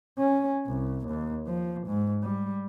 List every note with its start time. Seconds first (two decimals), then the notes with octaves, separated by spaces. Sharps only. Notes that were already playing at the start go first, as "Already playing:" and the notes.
0.19 C#4
0.66 C2
1.07 D#2
1.46 F3
1.87 G#2
2.23 G3